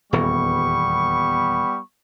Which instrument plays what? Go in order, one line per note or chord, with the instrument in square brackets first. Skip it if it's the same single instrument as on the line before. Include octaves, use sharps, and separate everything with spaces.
[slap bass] D#1 E2 E3 [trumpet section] G3 B3 C#6